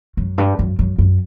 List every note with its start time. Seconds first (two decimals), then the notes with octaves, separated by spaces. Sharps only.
0.17 F#2
0.38 G2
0.59 F#2
0.79 F#2
0.99 F#2